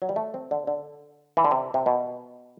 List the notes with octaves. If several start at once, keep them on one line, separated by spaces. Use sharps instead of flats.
F#3
G3
A3
C4
D3
D3
E3
D3
C3
C3
B2